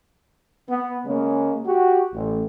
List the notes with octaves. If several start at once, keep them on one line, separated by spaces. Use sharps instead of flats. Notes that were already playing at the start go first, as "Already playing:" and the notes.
B3
C#3 G#3 A#3 C#4
F#4 G4
A1